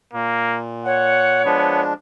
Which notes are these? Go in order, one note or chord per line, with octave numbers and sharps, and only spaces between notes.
A#2 A#3
C#5 F#5
F3 G#3 B3 D4